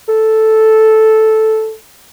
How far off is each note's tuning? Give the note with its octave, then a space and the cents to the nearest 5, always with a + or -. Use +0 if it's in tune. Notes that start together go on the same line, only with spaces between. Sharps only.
A4 -5